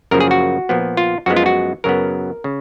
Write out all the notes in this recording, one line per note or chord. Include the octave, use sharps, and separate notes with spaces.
F#2 C#3 F3 A#3 A#4
G#4
F#4
A#2 F3 B3
F4
F#2 F3 G#3 B3 F#4
F4
F#4
F#2 C#3 F#3 B3 A#4
C#3